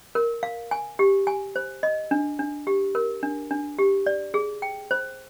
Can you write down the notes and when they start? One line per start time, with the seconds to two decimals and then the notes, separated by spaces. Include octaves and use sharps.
0.15 A#4
0.43 F5
0.71 G#5
0.99 G4
1.27 G#5
1.56 C5
1.83 D#5
2.11 D4
2.39 D4
2.67 G4
2.95 A#4
3.23 D4
3.51 D4
3.79 G4
4.06 D5
4.34 G#4
4.62 G5
4.91 C5